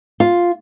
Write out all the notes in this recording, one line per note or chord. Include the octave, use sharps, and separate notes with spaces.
F4